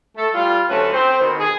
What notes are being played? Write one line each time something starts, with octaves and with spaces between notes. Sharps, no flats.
A3 A4
G3 F4
D2 F#3 A3 C#4 B4
C4 C5
B2 D#3 B3
G#4